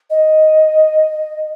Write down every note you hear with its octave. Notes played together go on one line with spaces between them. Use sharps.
D#5